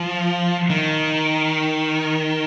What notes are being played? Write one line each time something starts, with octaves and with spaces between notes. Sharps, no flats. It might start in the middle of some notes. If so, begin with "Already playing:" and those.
Already playing: F3
D#3